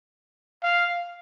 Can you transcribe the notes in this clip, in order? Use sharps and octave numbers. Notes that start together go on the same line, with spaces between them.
F5